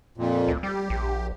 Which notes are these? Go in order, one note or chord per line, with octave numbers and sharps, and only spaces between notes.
F2 A#2
D2
G3 G4
A#1